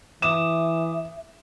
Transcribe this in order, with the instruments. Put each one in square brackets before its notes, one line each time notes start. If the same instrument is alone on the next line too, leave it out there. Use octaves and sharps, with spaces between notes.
[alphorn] E3 [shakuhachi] E5 [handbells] D6 D#6 [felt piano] E7